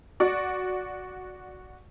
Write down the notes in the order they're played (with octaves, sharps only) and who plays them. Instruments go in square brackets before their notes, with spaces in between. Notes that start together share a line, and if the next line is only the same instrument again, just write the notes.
[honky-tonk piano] F#4 D5